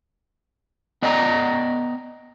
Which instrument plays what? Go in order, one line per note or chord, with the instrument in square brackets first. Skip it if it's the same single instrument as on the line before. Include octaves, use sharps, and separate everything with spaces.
[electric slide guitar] B3 D4 D5 D#5 G5 A#5